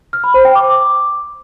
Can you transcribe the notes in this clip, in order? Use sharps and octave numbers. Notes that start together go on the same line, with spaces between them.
F6
B5
C5
G5
D6